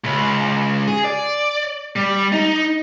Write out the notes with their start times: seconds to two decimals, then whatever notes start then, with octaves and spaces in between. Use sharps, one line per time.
0.04 C#2
0.87 G#4
1.04 D5
1.96 G3
2.32 D#4